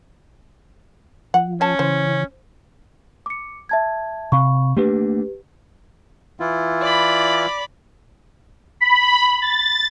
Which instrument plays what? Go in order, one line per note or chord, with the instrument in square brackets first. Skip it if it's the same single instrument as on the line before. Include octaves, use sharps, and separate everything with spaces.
[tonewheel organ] F3 [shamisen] F#5
[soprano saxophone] C#4 [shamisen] G#5 A5
[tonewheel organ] C#3 E3 [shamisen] C5
[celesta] D6 C#7
E5 A5 G#6
[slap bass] C3 [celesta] F5 B5 C#6
[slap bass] A3 A#3 D4 [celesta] G4 B4
[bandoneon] E3 E4 F4
[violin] D5 B5
[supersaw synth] B5
A6